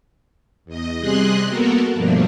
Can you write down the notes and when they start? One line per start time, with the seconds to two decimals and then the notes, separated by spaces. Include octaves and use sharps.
0.65 E2 D#5
1.00 C3 G3 G#4 D#5 C6 F#6
1.49 A#3 B3 F#4 A4 A#4
1.93 G2 B2 F3 A3 A#3 D4